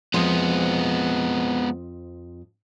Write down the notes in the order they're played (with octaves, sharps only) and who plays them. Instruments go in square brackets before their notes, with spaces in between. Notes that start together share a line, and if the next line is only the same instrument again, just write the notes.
[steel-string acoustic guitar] F2 C5 D#5 [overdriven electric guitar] G#3 B3